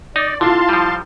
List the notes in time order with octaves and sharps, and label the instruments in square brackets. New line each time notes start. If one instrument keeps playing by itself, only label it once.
[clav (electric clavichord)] D#4 [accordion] D5
[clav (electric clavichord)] D3 [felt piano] E4 F4 [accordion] F5 A5 C6
[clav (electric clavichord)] F3 G3